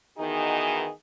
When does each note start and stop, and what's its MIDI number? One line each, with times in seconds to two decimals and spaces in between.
0.18 0.88 51
0.18 0.88 52
0.18 0.88 59
0.18 0.88 63
0.18 0.88 66
0.18 0.88 68